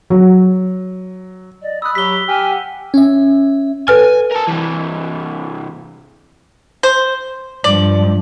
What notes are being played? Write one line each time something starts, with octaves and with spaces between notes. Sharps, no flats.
F#3
D5 D#5
B5 D#6 E6 F#6
F#3 G4 B6 G7
G4 G#5 F6
F#5
C#4 E5
A4 B4 G#5 F6
A#4 A5
C3 E3
C5
G2 F3 D5